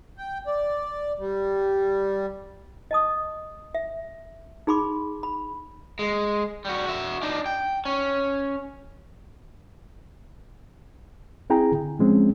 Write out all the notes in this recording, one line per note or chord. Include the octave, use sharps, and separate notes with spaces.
G5
D5
G3
D#5 A5 D#6
E5
D#4 G#4 B5 C6 D6
B5
G#3
G3 F#4
F#4 E5
D4 D#4
G5
C#4
C4 E4 G#4 G5 G#5 A#5
D3
F3 G#3 C4 C#4